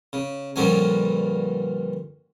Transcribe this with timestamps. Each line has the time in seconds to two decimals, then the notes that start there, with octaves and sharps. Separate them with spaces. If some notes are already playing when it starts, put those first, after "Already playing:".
0.13 C#3
0.56 G2 A#2 D3 F3 C#4 G#5